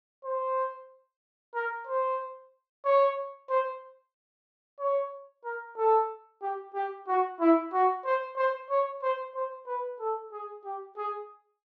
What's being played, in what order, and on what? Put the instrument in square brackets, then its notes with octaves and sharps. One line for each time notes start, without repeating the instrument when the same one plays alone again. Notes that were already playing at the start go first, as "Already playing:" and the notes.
[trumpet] C5
A#4
C5
C#5
C5
C#5
A#4
A4
G4
G4
F#4
E4
F#4
C5
C5
C#5
C5
C5
B4
A4
G#4
G4
G#4